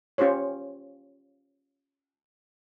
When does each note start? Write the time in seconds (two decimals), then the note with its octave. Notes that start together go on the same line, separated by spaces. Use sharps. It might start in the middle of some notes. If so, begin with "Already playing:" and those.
0.18 C#4 F4 G4 C5 C#5